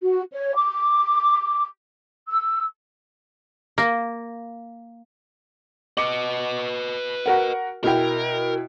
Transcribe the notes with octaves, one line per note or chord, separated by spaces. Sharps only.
F#4
C#5
D6
E6
A#3
B4 D#5 D6 C#7
F#4 A#4 F#5
B2 E4 A#4 G5